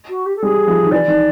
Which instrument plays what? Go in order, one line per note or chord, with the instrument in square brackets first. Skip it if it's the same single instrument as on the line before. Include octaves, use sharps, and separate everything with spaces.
[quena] F#4
G4
A4
[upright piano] G3 [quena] G#4
[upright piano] F3
D#3
[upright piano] E3 [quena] D5
[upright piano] D#3